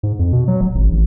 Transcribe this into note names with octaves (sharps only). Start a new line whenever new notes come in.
G#2
F2
B2
F#3
D#1
G#1
A1